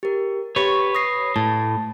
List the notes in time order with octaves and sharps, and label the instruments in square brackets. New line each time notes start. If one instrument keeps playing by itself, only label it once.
[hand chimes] G4 A#4
[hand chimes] G4 C#6 [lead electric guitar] B4 C#5
[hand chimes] D#6 A#6 C7
[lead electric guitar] A2 [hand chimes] A5